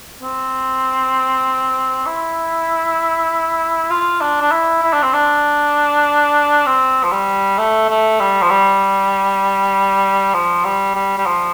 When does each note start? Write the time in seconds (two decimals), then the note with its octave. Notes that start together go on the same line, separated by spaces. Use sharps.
0.22 C4
2.06 E4
3.90 F4
4.21 D4
4.41 D4
4.51 E4
4.82 E4
4.93 D4
5.03 C4
5.13 D4
6.66 C4
7.04 F3
7.12 G3
7.58 A3
7.89 A3
8.20 G3
8.42 F3
8.50 G3
10.34 F3
10.65 G3
10.95 G3
11.18 G3
11.26 F3